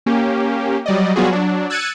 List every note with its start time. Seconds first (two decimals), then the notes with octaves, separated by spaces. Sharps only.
0.06 A#3 C#4 G4
0.86 F#3 G3 D5 D#5
1.16 F#3 G3 B3 F4 F#4 G#4
1.29 F#3 D4
1.70 E6 F#6 G#6 A6 C#7 D#7